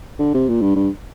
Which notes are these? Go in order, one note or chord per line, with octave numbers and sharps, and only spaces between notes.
D3
C3
A#2
G2
G2